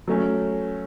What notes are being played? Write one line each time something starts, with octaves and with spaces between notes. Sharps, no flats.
F#3 A3 C#4